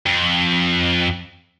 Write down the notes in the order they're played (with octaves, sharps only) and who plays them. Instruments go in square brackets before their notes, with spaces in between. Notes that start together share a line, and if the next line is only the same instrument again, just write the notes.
[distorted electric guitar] F2